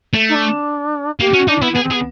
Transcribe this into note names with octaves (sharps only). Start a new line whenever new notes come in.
A3
D#4
D4
A#3 G4
C#4 F#4
D4 D#4
B3 E4
B3 G#4
C4
G#4
B3